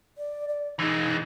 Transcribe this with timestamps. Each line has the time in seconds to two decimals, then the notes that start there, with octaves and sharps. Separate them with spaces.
0.17 D5
0.48 D5
0.79 E3 G#3 D#4